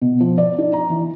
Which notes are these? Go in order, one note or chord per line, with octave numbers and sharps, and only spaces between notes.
B2
F3
D5
D#4
A#5
E3